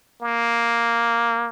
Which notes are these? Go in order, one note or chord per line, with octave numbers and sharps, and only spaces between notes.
A#3